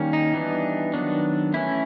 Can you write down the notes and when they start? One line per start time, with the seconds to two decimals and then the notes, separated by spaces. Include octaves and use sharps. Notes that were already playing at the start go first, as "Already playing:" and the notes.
Already playing: D#3 G3 A#3 C#4
0.13 D#4
0.33 E3 G3 B3 D4
0.94 D#3 F#3 B3 D4
1.54 E3 A3 C#4 E4